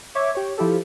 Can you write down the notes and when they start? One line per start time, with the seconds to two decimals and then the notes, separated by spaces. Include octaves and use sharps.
0.15 C#5 E5 C#6 D6 G#6
0.35 G4 C#5
0.58 F3 E4 G4 A4